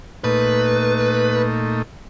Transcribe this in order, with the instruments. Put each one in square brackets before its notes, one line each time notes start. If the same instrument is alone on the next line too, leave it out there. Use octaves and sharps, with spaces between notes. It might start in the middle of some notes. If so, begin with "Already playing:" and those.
[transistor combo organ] A#2 A3 D#4 [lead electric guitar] B4